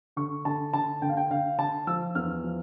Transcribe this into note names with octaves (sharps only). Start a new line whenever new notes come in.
D3 C#6
D3 A5
D3 A5
D3 G5
F5
G5
D3 F5
D3 A5
F3 E6
E2 F6
F3